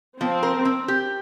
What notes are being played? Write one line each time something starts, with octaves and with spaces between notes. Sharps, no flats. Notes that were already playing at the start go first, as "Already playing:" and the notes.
F3 C4
A#4
C4
G4